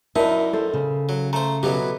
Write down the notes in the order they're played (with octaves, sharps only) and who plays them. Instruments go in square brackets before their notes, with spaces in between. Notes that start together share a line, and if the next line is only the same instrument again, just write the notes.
[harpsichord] F#2 D#4 [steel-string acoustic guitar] E4 [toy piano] A#4 D5 A5 [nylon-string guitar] E5
[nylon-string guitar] A4 C5
[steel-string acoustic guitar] C#3
[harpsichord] F#3
[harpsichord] A3 C5 [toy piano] A#5
[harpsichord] B2 E3 F#3 [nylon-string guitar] G4 A4